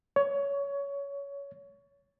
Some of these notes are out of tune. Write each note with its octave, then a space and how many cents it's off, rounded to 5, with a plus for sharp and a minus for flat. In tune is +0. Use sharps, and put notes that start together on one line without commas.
C#5 +20